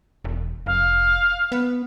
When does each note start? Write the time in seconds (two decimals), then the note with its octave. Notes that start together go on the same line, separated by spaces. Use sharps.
0.25 E1
0.66 F1 F5
1.52 B3